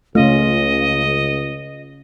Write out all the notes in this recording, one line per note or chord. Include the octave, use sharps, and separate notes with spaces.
C#2 C#3 A3 C#4 F4 D#5